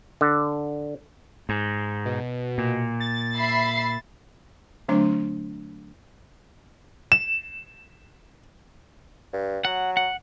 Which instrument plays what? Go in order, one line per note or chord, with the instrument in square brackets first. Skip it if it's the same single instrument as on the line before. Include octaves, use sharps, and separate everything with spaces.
[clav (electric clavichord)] D3
[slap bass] G#2
[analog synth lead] B2
[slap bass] A#2
[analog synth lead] A6
[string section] E5 B5 C7
[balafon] D3 F#3 A3 C4 D4 C6
[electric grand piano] E7
[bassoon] G2
[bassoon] F#3 [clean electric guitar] F#5
[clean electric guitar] F#5